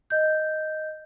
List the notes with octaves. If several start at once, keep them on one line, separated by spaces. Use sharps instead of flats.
D#5 G6